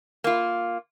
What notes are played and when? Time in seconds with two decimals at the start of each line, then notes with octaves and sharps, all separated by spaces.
0.24 A#3 F4